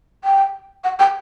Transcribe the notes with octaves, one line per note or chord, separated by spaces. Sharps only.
G5
F#5
G5